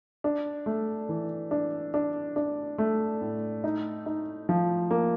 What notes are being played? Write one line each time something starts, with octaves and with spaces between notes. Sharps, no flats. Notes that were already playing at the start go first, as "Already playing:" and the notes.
D4
A3
E3
D4
D4
D4
A3
A2
D#4
D#4
F3
A#3